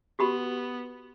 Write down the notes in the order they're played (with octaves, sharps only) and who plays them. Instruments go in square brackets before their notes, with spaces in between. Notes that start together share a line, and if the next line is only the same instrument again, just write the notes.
[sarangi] B3 [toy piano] F#4 G4 B5